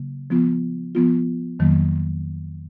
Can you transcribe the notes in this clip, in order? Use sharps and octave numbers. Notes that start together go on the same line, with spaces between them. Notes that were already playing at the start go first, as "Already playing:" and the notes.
Already playing: C#3 F#3 A#3
F3 B3 F4
F3 B3 F4
F2 D#3 F#3 A#3